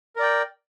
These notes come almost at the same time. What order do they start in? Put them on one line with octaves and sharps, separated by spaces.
A#4 D5 G5